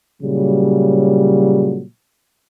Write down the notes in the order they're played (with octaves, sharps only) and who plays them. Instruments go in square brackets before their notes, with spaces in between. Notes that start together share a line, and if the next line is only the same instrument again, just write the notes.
[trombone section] A#2 C#3 F#3 G3